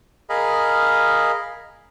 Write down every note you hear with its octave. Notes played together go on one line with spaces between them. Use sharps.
G#4 A#4 D#5 F5 B5